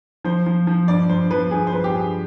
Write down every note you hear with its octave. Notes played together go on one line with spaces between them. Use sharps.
F3 C5
F3
F3
G2 D5
G2 C5
F3 B4
G2 G#4
C5
G2 B4
G4
G2 G#4